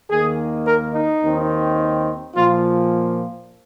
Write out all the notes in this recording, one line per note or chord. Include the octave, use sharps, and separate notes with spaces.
D#2 D#3 A#3 G#4
A#4
D#4
D#2 D#3 C4
A#2 F3 A#3 F4